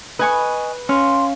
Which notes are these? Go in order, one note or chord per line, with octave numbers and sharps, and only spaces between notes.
B4 D#5 G#5 C#6
C#4 F5 C6